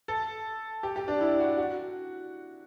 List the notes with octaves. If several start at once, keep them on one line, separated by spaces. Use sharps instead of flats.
A4
G4
G4
D4
E4
F#4
F#4